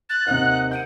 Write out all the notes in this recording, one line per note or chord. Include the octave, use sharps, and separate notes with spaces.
F#6 A6
D#2 C3 D#5 F#5
F#5 G6 D7 D#7